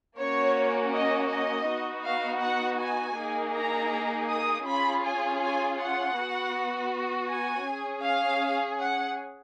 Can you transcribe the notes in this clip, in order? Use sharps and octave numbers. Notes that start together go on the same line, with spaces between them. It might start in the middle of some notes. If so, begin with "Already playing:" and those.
A#3 C#4 F#4 C#5
D#5
D#5
B3 D#4 F#4
F5
F#5
G#5
A#3 D#4 G#4
A#5
D#6
C#4 F4 G#4 B5
G#5
G#5
F#5
B3 F#4
G#5
C#4 G#4
F5
F#5